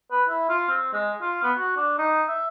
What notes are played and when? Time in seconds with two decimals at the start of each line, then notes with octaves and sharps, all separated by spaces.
0.11 B4
0.29 E4
0.49 F4
0.70 C4
0.93 G#3
1.21 F4
1.43 B3
1.58 F#4
1.77 D4
1.98 D#4
2.28 E5